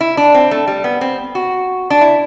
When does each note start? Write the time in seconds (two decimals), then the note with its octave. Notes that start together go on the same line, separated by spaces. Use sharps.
0.01 E4
0.17 D4
0.34 C4
0.51 A3
0.68 G3
0.84 B3
1.01 C4
1.35 F#4
1.90 D4
2.01 E4